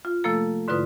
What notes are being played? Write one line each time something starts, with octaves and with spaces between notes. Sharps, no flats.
F4
C3 F3 A3 A#3 A4
G#2 D3 E4 F4 B4 D#6